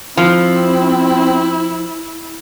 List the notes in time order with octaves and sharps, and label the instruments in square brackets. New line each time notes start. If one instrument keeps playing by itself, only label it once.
[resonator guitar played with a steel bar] F3 [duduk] C4 [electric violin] E4